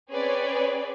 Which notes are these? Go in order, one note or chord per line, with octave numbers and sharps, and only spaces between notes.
C4 C#4 G#4 B4 C#5 D5